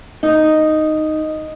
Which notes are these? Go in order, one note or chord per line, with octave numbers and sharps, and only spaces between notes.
D#4